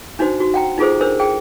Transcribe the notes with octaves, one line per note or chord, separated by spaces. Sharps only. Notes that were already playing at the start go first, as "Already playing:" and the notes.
D4 D#4 F#4 C5
F#4
F#5 G5 A#5
D#4 F4 G#4 A4 C5
D4 A#4 C5 E6
G#4 G5